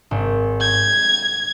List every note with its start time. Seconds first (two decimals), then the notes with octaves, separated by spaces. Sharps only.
0.11 G#1
0.61 G6 G#6